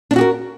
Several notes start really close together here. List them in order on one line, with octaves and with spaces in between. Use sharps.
D4 C#4 F#4 G4 A#4